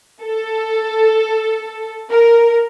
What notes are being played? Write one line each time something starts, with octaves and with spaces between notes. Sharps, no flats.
A4
A#4